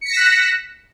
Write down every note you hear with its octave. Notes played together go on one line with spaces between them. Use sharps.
F#6 A#6 B6 C#7 E7